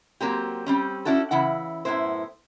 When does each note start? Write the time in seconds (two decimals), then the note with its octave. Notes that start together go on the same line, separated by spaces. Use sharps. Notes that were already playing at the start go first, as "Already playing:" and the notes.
0.21 F#3 A#3 C4 G4
0.67 G3 C4 C#4
1.05 C#4 D4 E4 F#4 A4
1.31 C#3 E3 E4 F#5
1.85 F#2 A2 B3 E4 C5